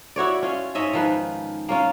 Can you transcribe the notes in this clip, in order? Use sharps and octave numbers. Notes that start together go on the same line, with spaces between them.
E4 F#4 C#5 D5
C#4 F4
G#2 C#4 D#5 E5
D#3 F3 B4
A#3 C#4 F4